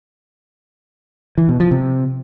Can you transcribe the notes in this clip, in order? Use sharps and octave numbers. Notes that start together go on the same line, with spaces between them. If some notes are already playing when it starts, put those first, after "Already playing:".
E3
B2
F3
C3